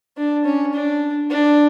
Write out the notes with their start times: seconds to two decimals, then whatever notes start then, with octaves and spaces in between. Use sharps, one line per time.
0.17 D4
0.45 C#4
0.73 D4
1.30 D4